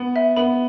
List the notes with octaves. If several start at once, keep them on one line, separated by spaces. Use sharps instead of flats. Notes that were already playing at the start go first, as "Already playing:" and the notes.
Already playing: B3
E5
B3 B5